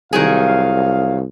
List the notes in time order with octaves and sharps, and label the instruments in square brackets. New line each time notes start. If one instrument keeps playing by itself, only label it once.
[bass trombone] C2 [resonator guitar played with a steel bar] D#3 F#3 G#4 [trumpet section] F5